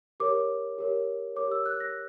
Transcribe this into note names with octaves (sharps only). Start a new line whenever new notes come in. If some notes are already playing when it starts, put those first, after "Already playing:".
G4 A#4 C#5 D6
G4 A#4 C#5
G4 A#4 C#5 D6
E6
F#6
A#6